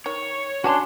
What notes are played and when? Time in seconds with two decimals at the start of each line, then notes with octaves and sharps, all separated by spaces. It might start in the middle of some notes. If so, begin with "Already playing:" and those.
0.06 D#3 C#5
0.64 C#4 D4 F#4 G#5 A5 C6